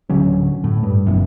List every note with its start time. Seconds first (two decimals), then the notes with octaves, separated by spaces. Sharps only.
0.10 D1 D3 F#3 C#4
0.64 A2
0.83 G2
1.07 F#1 B1 F#2